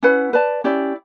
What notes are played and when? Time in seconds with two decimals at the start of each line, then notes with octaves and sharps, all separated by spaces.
0.03 C#4 E4 B4 F#5
0.33 B4 D5 A5
0.64 C#4 E4 G4 D5